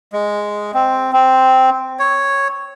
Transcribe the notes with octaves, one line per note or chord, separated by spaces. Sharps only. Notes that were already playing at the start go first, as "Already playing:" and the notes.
G#3
C4
C4
C#5